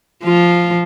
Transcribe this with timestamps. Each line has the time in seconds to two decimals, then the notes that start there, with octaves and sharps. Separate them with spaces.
0.24 F3 F4